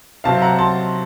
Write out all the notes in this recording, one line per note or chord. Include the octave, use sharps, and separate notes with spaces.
C3 F#3 C4 F5 A5
F#5 A#5
A5 C6